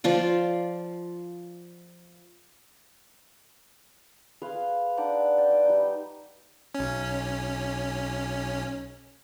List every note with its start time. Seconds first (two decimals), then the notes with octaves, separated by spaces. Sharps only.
0.04 F3 F4 D5
4.42 G#4 B4 F5 C6
4.97 D4 D#4 F#5 D6
5.38 D5 G5 G#5
5.50 D6 E6
5.65 G3 D#4
6.75 B1 C#4